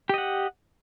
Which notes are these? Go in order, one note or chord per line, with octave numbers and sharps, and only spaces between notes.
G4 D#5 F#5